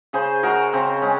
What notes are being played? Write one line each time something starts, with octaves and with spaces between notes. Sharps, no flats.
C#3 G#4 C5
G#3 F#4 A#4
C#3 C4
G#3 C#4